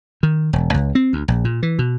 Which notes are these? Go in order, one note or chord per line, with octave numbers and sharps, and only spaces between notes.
D#3
E1
C#2
C4
D2
A#1
A#2
E3
B2